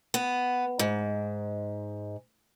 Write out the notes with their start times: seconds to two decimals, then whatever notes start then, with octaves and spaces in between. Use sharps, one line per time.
0.14 B3
0.79 G#2